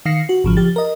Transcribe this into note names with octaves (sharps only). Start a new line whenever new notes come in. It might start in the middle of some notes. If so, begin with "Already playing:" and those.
D#3 F5 A#6 C7 C#7
F#4
G#1 C#3 F3
F3 G4 A6
A#4 D#5